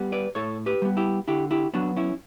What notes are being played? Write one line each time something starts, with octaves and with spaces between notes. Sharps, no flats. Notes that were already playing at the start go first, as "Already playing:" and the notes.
Already playing: G3 B3
B4 D5
A2 A4 C#5
G4 B4
G3 B3
E4 G4
D3 E4 G4
E4 G4
F#3 B3 D4 F#4
C#4 E4